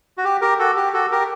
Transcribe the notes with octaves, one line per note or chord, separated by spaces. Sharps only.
F#4
G4
G4 A#4
F#4 A4
G4
F#4 A4
G4 A#4